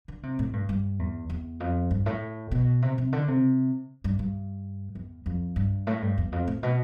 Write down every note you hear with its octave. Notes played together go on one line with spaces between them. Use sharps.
D3
C3
A2
G2
G2
E2
E2
F2
G2
A2
B2
C3
C3
D3
C3
G2
G2
E2
F2
G2
A2
G2
E2
F2
A2
B2